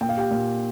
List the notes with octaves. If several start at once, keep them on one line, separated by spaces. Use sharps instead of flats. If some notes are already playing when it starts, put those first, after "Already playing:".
A#2 G5
F5
G4 G5
A#2